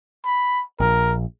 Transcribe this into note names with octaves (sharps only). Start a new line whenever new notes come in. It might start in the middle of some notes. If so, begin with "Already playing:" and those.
B5
A#1 A#4